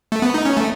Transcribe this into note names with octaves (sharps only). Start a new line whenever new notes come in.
A3
B3
D#4
C#4
A3